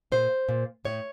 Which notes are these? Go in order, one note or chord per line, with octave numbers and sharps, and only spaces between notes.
A#2 C5
A#2
A2 C#5